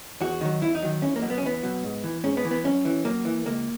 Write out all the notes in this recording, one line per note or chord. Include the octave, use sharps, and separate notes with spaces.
E2 F#4
D#3 F#3
E2 E4
D#4
D#3 F#3
E2 C#4
A#3
B2 F#3
B3
C#4
E2 B3
B2 F#3
G#2
E3
G#2 C#4
B3
E3
B3
F#2 C#4
E3
F#2 A#3
E3
C#2 A#3